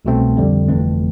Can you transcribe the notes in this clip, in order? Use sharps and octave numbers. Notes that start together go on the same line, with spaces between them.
C2 B2 A3 C4
F2 D3 G3
G1 F2 E3 A3 C4